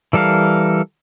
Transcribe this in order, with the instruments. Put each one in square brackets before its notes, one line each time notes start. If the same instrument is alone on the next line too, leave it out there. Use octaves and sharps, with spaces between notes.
[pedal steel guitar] E3 G3 A4 A#4 F5